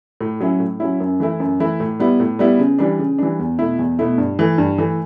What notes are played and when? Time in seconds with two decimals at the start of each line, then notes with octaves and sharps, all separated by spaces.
0.21 A2
0.40 F#3 C#4 E4
0.60 A2
0.80 F#3 C#4 E4
1.00 F#2
1.20 E3 A3 E4
1.40 F#2
1.60 E3 A3 E4
1.80 A2
1.99 G3 B3 E4
2.20 A2
2.39 G3 B3 E4
2.59 C#3
2.79 E3 G3 D4
2.99 C#3
3.19 E3 G3 D4
3.39 E2
3.59 B2 A3 E4
3.79 E2
3.99 B2 A3 E4
4.18 G2
4.39 E3 A3
4.58 G2
4.78 E3 A3